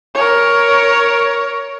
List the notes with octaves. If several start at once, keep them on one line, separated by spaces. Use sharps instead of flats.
A#4 C#5